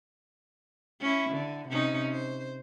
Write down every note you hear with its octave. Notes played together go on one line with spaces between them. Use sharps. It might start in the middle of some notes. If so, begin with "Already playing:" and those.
C#4 E4
D3
C3 C#4 D#4
C5